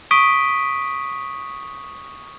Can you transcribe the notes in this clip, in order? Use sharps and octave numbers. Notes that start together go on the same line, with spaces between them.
C#6 D#6 B6 D7 D#7 G7